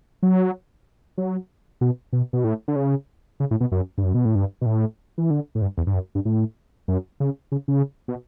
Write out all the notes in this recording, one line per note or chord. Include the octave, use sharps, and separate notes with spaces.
F#3
F#3
B2
B2
B2
A2
D3
C#3
C#3
A2
B2
F#2
G2
F#2
B2
A2
G2
B2
A2
E3
D3
A2
G2
E2
G2
F#2
G2
A2
F#2
C#3
C#3
C#3
B2